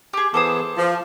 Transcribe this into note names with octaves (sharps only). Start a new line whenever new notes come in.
G4 G#4
E3 B3 G#4 A4 C5 D6 D#6 E7
F3 A5